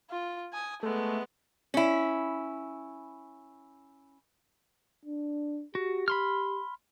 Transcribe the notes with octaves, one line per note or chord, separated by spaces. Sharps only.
F4
G#5 D#6
G#3 A3 B3
C#4 E4
D4
F#4 G4
B5 C6 F6